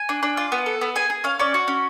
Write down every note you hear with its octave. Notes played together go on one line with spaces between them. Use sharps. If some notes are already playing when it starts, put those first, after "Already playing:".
Already playing: G#5
D4
D4
F4
B3
A4
B3
G#4 G#5
G#4
C#4 F5
C#4 D5
F#4
C#4